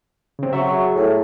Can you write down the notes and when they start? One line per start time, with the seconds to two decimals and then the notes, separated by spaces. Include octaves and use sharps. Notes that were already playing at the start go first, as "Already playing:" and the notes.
0.39 C#3 C4
0.53 F#3 E5 C#6
0.67 G#4 E5
0.95 A2